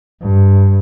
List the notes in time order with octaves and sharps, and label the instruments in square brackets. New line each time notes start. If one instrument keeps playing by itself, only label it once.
[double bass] G2